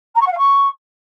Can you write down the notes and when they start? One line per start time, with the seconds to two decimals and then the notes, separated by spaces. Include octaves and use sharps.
0.15 A#5
0.20 C#6
0.26 F#5
0.32 F5
0.37 C#6